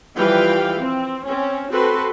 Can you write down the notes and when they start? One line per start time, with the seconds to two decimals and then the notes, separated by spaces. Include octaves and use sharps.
0.17 E3 F3 G3 B4 F5 G5
0.79 C4
1.27 C4 C#4
1.71 C4 F#4 A4 B4 C6